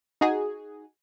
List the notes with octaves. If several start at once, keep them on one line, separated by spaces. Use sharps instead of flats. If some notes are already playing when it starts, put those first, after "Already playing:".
D#4 F#4 G#4